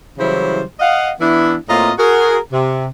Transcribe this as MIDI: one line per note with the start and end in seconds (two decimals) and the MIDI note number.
0.18 0.63 49
0.18 0.63 52
0.18 0.63 54
0.18 0.63 55
0.18 0.63 64
0.18 0.63 72
0.80 1.11 75
0.80 1.11 77
0.80 1.11 78
1.20 1.56 52
1.20 1.56 59
1.20 1.56 62
1.20 1.56 64
1.69 1.92 45
1.69 1.92 58
1.69 1.92 60
1.69 1.92 65
1.69 1.92 75
1.69 1.92 82
1.98 2.37 66
1.98 2.37 68
1.98 2.37 70
2.52 2.86 48